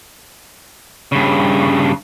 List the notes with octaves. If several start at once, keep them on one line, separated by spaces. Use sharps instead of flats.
G2 C#3